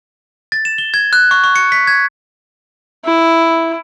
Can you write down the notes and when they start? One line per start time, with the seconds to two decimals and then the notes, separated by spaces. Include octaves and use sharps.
0.52 A6
0.65 E7
0.78 G7
0.94 G#6
1.13 F#6
1.31 C#6
1.44 C#6
1.56 C#7
1.72 B6
1.87 G#6
3.05 E4